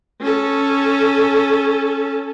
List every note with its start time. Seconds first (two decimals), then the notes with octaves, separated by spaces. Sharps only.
0.22 C#4 A4